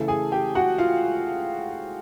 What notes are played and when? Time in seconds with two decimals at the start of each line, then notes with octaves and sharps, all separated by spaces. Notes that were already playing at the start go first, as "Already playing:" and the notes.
Already playing: C#3 E3 A3 A4 A5
0.08 G#4 G#5
0.32 G4 G5
0.55 F#4 F#5
0.78 F4 F5